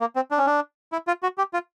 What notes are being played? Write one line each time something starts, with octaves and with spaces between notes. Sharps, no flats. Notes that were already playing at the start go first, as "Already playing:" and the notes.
A#3
C4
D4
C#4
D4
E4
F4
F#4
G4
F4